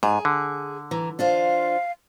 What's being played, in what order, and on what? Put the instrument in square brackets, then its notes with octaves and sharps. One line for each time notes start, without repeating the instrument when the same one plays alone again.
[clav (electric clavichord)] G#2 [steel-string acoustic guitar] G#4
[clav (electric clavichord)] D3
[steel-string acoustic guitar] E3 [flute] A#5
[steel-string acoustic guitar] D4 F4 C5 [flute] F5